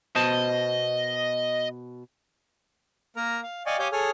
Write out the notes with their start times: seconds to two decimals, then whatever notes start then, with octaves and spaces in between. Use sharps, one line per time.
0.16 B2 C5 D#5 A5
3.16 A#3 A#4 A#5
3.43 F5
3.66 D5 D#5 F5 G5 G#5 C#6
3.79 G4 C#5 F5 G#5 D#6 G6
3.92 G#4 A4 C#5 G#5 D#6 F6